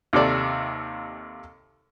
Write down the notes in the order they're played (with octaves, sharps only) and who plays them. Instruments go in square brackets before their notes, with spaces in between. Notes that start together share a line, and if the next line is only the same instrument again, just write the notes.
[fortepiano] D#2 C3 A4 D5